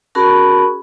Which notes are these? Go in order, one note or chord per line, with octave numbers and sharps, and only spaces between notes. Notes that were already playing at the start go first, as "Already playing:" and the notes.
C#4 F#4 G#4 A#4 A5 B5